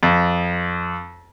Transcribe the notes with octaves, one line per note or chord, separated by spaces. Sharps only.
F2